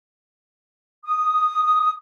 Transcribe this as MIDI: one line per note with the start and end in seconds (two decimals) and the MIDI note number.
1.05 1.92 87